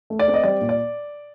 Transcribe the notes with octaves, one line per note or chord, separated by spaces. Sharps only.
A3
D5
C4
D#5
G3 D5
A#2
D5